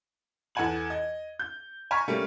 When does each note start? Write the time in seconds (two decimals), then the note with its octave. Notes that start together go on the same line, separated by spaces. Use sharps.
0.55 E2 A4 F#5 G#5 G#6 F#7
0.90 D#5
1.39 G6
1.91 G#5 A#5 C#6 F6 B6
2.08 G3 A3 A#3 C#4